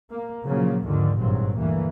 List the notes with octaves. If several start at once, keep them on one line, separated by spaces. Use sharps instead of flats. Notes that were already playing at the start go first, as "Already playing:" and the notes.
A#3
A#2 C#3 F3 F#3 A#3
D#2 G#2 D3 D#3 F3
G#1 G2 A#2 F#3 C4
D2 G2 E3 A#3